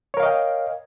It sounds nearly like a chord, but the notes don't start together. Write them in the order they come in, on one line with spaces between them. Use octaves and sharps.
C#5 A#4 F5 D#5 G5